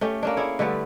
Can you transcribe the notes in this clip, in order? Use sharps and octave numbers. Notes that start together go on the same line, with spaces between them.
A3 C#4 G4
A#3 C#4 D4
E4 G#4 C#5
D3 G3 A3 B3